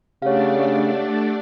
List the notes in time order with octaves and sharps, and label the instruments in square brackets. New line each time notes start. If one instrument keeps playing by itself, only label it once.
[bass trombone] C#3 [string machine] A3 D4 D5 [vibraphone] G4 F#5 [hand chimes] C#5 F5